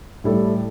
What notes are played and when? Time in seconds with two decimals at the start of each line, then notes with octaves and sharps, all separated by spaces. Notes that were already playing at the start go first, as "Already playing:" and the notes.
0.24 A2 G3 E4 A4